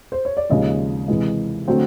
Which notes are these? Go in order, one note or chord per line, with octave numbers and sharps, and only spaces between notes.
C5
C#5
D5
D#2 C#3 F3 G#3 D#5
C3 E3 G#3
D3 F#3 A3 C4